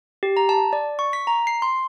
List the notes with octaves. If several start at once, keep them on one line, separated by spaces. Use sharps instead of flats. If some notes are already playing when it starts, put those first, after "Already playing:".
G4
A#5
A5
D5
C#6
B6
A#5
C7
C6